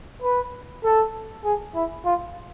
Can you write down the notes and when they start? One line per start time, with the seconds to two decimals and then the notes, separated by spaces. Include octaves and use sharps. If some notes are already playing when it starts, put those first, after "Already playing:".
0.23 B4
0.84 A4
1.44 G#4
1.75 E4
2.05 F4